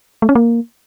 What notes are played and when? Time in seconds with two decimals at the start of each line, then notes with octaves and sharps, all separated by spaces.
0.22 A3
0.29 C#4
0.35 A#3